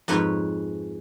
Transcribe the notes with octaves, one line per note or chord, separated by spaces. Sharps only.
F2 G#2 B4 C#5 G5